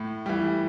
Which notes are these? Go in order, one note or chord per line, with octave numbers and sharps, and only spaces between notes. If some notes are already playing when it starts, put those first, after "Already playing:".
Already playing: A2
E3 G3